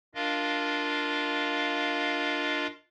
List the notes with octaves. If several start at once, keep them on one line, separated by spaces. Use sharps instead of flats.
D4 F4 A#4 D#5 F5